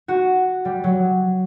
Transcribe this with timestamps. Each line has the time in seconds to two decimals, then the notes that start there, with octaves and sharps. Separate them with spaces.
0.08 F#4
0.65 G3
0.84 F#3